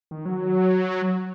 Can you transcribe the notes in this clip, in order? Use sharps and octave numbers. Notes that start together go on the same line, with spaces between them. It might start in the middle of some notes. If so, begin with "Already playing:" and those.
D#3
F#3